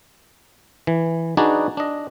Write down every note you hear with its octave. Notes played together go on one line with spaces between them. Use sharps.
E3
D4 D#4 F#4 G#4 B4 D5
D4 D#5